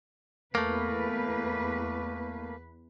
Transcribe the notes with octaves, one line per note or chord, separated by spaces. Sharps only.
E2 A3 A#3 B4